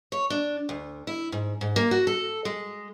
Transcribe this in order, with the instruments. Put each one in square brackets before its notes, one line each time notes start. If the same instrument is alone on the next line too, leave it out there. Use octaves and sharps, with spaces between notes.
[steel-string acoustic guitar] C#5
D4
D2
E4
G#2
G#2
A#3
F#4
A4
G#3